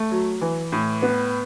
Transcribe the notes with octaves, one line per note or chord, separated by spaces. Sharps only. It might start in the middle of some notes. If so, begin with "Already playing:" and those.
Already playing: A3
F#3
E3
A2
B3